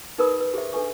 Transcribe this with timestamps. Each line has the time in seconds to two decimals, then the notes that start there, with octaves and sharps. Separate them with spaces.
0.18 D#4 G#4 A#4 B4 B5 D#6
0.40 B4
0.54 G4 G#4 C5 E5
0.73 D4 A4 B4 G#5 C#6